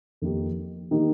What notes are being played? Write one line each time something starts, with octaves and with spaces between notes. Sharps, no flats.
F2 D#3 A#3 D#4 G4
D#3 A#3 D#4 G4